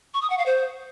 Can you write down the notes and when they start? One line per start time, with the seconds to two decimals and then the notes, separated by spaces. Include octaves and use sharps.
0.14 C#6
0.22 D#6
0.30 F#5
0.38 F5
0.46 C5